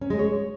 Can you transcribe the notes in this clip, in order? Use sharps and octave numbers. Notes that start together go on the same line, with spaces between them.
C#4
G#3
C#5